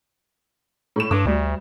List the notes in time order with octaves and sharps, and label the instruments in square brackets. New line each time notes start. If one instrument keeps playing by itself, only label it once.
[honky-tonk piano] A2 E7
[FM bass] G2 [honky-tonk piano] D6
[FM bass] D2 [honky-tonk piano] G3